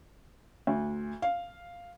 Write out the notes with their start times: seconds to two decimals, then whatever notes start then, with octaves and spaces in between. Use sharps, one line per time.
0.67 D2
1.22 F5